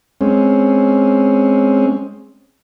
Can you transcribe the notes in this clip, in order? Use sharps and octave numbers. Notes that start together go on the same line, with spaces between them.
G#3 C4 C#4